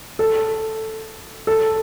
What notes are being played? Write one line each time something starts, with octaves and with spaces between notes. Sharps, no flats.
A4
A4